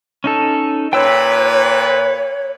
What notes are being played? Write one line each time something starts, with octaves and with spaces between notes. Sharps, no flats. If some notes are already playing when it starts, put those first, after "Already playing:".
C#4 D#4 A4
A#2 B4 C#5 G5 E6